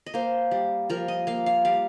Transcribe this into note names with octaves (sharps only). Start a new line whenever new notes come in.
D#5
A#3 C5
G3
F3 A#4
D#5
A#3 F5
F5
G3 F5